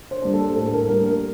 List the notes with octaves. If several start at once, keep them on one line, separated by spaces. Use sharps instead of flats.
C5
G3 A#3 D4
A4
A2 A4
A4
A#4
G3 A#3 D4 A#4
A#4